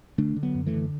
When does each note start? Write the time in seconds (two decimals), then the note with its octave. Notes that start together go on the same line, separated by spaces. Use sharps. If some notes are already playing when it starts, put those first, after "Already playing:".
0.18 D3 A3 D4
0.36 D3
0.43 F#3 B3
0.55 F#2
0.66 E3 A3
0.74 D3